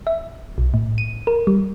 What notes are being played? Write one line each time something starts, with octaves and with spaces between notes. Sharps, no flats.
E5
B1
A2
D#7
A#4
G3